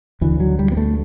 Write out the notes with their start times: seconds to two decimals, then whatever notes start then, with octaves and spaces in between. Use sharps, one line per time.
0.21 D2 D3 E3
0.40 F#3
0.59 G3
0.72 B3
0.77 A3